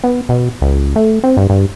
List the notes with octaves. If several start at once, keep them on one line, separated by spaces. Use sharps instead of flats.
B3
B2
C#2
A3
C4
G2
G2